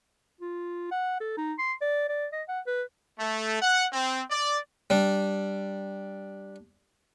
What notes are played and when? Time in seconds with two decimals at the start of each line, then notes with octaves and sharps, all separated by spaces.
0.41 F4
0.91 F#5
1.20 A4
1.37 D#4
1.59 C6
1.81 D5
2.09 D5
2.33 D#5
2.49 F#5
2.67 B4
3.19 A3
3.62 F#5
3.92 C4
4.30 D5
4.90 G3 D4